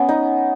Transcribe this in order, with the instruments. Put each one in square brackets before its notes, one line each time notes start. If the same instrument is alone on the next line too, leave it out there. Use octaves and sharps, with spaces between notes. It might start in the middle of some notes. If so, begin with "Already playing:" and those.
Already playing: [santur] B3 C#4
D#4